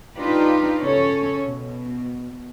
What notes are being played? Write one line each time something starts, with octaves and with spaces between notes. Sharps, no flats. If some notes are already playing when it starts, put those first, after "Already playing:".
D4 D#4 F4 G4 B4
C#3 C#4 A4 C#5
B2